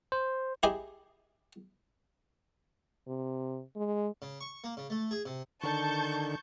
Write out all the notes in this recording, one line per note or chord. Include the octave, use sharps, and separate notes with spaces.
C5
E4 G4 G#4 D#5
C3
G#3
C#3
C#6
A#3
C#3
A3
G#4
C3
D3 D#3 A5 C#6 G6